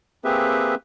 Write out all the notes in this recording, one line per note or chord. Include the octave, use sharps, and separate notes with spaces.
A#3 C4 G4 G#4 B4 E5